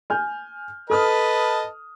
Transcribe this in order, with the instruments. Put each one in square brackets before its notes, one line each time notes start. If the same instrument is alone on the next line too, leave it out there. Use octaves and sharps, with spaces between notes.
[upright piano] G#5 F6 G6
[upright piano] A4 D#6 F6 [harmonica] B4 D#5 A5